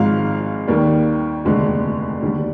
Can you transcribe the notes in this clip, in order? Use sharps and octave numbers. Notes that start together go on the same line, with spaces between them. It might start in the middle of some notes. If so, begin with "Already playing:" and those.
Already playing: G#1 G#2 F3 G#3 F5
D#2 D#3 G3 A#3
F1 D#2 D3 G#3
D#2 D3 G3